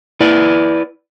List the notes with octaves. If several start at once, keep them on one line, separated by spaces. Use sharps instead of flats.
E4 B4 D5